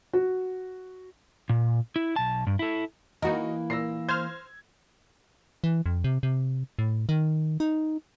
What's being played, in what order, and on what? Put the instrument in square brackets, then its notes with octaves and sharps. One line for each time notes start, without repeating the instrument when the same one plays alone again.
[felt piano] F#4
[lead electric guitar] A#2
E4
B1 A5
G2
E4 A4
[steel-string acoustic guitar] E3 A#3 [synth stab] D#4 F#4 A#4 [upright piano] D#5
[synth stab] A#2 [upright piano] E6 A#6 C7
[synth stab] C5 F6 [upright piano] G#6
[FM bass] E3
F2
C3
C3
A2
D#3
D#4